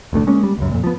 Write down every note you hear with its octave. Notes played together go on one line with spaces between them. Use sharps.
F1 D2 A3 D4
G#3 A#3 C#4
G3
C#2 F#2
F2 A#2
F3 B3